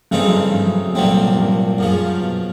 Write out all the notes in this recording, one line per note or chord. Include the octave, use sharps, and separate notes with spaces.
G2 C#3 E3 A3 C4 D#4
F#2
G2
G2
F#2
F#2
C2 G2 A#2 F#3 A3 C4
G2
F#2 C#3 F3
B2